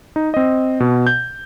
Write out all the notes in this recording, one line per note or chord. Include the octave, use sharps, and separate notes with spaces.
D#4
C4 D#5
B2
G6